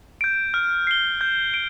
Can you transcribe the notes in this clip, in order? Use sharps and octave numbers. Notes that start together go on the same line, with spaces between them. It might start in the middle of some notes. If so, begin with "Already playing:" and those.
G6 D7
F6
C7 G7
G6
D7